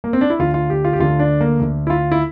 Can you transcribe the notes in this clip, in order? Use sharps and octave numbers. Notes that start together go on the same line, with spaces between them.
A#3
C4
D4
E4
D2 D3 F4
F4
G4
F4
G4
D2 D3 F4
D4
A#3
D2 D3
E4
F4
E4